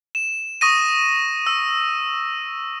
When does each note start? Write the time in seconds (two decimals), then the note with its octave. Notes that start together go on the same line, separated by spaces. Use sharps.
0.15 E7
0.61 C#6 D#6 A#6 D#7
1.47 E6